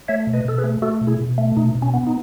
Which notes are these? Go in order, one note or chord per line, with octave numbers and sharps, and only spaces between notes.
A3 C#5 E5
B2
B4 D#5
B2 A4
G#4 B4
A3
A3 F#4 A4
B2
E4 G#4
B2
A3
B2 D#4
B2
C#4
B3
D#4